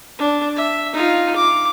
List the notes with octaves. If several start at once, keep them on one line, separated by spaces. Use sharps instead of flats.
D4
E5
D#4 F4
D6